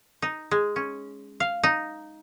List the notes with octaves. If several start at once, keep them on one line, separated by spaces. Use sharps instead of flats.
D#4
G#3
C#4
F5
D#4